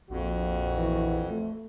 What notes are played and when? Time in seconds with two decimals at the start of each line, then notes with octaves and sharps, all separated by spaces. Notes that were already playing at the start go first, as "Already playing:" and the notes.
0.10 A#1 F2 F#4
0.76 E3
1.30 A3